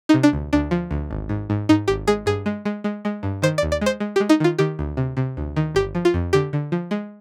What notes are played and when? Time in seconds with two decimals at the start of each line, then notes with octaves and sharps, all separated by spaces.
0.09 D#4
0.14 C3
0.23 D4
0.33 D2
0.53 D2 D4
0.71 F3
0.91 D2
1.11 G#1
1.29 G#2
1.50 G#2
1.69 G#2 D#4
1.88 G#1 G4
2.08 G#3 G#4
2.26 G2 G#4
2.46 G#3
2.65 G#3
2.84 G#3
3.05 G#3
3.23 G2
3.42 D#3 C5
3.58 D5
3.63 D#2
3.72 D5
3.81 G#3 C5
4.00 G#3
4.16 G4
4.20 G#3
4.29 D#4
4.40 D#3 F4
4.58 D#3 G4
4.79 D2
4.97 C3
5.17 C3
5.37 D2
5.56 D#3
5.75 G1 G4
5.95 F3
6.05 F4
6.14 F2
6.33 D3 G4
6.53 D3
6.72 F3
6.91 G#3